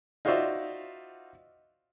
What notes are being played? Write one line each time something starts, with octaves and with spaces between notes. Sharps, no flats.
D#4 F4 F#4 C5 D5 E5